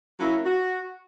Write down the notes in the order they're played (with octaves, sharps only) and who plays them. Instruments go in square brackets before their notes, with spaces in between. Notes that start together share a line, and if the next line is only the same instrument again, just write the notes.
[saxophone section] F#3 A#3 C#4 E4
F#4